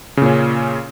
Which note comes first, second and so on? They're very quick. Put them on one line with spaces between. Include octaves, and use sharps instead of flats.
C#3 A#2 C#4